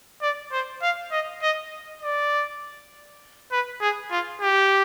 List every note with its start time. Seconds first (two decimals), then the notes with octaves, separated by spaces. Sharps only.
0.22 D5
0.52 C5
0.82 F5
1.12 D#5
1.42 D#5
2.02 D5
3.52 B4
3.81 G#4
4.11 F4
4.42 G4